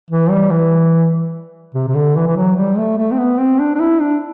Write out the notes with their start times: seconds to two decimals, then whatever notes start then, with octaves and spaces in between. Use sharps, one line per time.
0.10 E3
0.31 G3
0.51 E3
1.75 C3
1.88 C3
1.95 D3
2.16 E3
2.26 E3
2.36 F#3
2.56 G3
2.78 A3
2.98 A3
3.12 C4
3.18 B3
3.39 C4
3.59 D4
3.75 D4
3.80 E4
4.01 D4